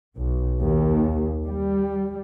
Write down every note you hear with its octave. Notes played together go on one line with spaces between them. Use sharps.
B1
D#2
G3